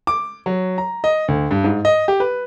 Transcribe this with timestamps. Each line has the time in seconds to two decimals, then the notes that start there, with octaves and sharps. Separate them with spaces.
0.07 D6
0.46 F#3
0.78 A#5
1.04 D#5
1.28 D2
1.51 G2
1.64 G#2
1.85 D#5
2.08 G4
2.20 B4